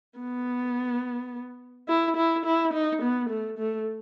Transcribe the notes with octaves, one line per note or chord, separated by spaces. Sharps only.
B3
E4
E4
E4
D#4
B3
A3
A3